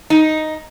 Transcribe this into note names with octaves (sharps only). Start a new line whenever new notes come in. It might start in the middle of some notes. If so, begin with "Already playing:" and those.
D#4